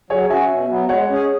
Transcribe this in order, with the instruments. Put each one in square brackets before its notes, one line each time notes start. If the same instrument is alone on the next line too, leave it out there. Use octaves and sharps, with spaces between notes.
[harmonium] F#3 [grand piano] G#4 C#5
[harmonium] C#4 F#4 [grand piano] E5 G#5
[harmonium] B2
F#3 B3
[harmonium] G#3 [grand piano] C#5 F#5
[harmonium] C#4 G#4